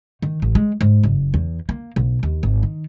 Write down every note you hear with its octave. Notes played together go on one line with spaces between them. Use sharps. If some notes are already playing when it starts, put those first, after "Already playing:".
D#3
A1
G#3
G#2
F#1
E2
A#3
B1
D#2
G#1
D#3